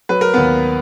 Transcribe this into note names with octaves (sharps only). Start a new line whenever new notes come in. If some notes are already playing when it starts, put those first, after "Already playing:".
F#3 B4
A#4
D#2 B3 B4